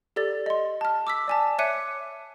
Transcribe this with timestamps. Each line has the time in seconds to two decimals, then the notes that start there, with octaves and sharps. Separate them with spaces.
0.16 G4 A4 D5 A6
0.46 D#5 C6
0.81 A5 F6
1.07 D6 E6 B6
1.28 D5 G#5 A5
1.58 C#5 E5 D6 F#6 C#7 D#7